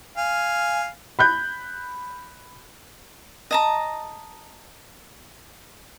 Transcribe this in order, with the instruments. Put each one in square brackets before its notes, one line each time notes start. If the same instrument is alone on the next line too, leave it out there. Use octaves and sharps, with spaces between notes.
[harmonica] F5 G#5
[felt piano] B5 F#6 G6
[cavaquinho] D#5 A5 A#5